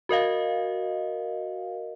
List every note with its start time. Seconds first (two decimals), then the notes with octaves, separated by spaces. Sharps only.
0.09 F#4 A#4 D#5 F5